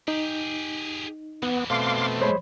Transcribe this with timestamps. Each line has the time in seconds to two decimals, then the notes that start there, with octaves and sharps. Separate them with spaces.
0.08 D#4 G4 G#4
1.43 F2 E3 B3
1.70 B2 A3 C4 F5 C6 D6
2.22 G#3 C5 C#5 B5